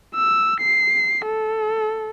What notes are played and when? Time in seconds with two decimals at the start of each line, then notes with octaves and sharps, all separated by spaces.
0.15 E6
0.61 C7
1.25 A4